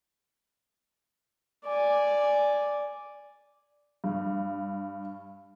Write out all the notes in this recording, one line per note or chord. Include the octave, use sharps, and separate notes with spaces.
D5 G#5
G2